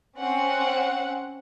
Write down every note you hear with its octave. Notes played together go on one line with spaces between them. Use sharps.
C4 C#4 F#5